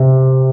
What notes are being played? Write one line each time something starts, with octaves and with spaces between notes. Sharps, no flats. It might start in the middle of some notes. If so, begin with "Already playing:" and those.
Already playing: C3